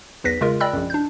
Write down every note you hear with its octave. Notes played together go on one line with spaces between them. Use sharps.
B1 E2 B4 A#6 B6
C#3 G#3 F4 A#4
D5 D#5 G5 B5 E6 F#6
A#1 F#2
D4 G6